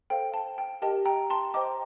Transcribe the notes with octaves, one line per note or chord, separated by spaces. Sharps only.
A4 C5 F5 G5
A5
G5
G4 A#4 D#5 G5 A5
G5 A#5
A5 C6
C5 D#5 G5 A#5 D6